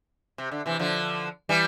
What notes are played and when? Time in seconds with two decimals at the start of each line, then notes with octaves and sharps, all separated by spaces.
0.38 C3
0.51 D3
0.66 C3 E3
0.79 D3 F3
1.49 E3 G3